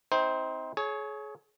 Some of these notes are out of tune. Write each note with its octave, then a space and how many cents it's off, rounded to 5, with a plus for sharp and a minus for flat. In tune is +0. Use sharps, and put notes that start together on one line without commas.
C4 +0 D#4 +40 C5 +0
G#4 +35 C#5 +0